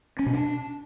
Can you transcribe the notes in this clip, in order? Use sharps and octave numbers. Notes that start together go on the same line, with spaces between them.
C#4
B2
D4